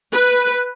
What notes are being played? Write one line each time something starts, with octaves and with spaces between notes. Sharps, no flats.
B4